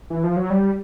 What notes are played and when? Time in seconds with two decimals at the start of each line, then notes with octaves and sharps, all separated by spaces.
0.10 E3
0.24 F3
0.37 F#3
0.50 G3